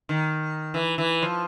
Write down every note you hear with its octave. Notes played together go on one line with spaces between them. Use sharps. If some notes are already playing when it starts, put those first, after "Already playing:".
D#3
E3
E3
F3